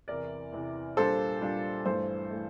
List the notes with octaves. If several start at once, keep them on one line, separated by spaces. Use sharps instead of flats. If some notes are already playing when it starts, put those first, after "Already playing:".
E2 C3 E3 A#4 D5
E2 C3 E3
A#2 G3 D4 F4 A4 C5
A#2 G3 D4 F4
G2 E3 A3 A4 C5
E3 A3